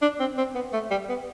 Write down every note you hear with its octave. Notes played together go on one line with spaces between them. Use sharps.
D4
C4
C4
B3
A3
G3
B3